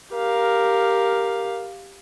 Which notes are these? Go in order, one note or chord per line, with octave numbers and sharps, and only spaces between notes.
G4 A#4 F5